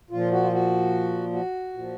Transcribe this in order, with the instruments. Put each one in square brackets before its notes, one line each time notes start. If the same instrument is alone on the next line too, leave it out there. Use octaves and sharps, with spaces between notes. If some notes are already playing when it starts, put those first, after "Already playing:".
[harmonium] A#2 F3 F4
F#4
F4
F#4
F#4
A#2
F3